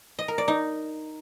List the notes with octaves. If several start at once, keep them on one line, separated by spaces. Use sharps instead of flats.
D#5
A#4
D5
D#4